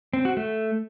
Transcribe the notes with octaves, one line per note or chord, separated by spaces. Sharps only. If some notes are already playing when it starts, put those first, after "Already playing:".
C4
F#4
A3